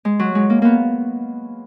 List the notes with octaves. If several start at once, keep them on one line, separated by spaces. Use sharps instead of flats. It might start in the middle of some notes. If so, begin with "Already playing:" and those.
G#3
F#3
G#3
A#3
A#3 B3